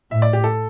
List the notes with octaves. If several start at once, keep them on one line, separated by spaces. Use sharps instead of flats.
A2 E5
D5
G4
A4